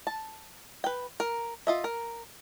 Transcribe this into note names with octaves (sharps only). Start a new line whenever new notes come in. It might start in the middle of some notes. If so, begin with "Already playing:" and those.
A5
B4 G5
A#4
F4 D#5 E5
A#4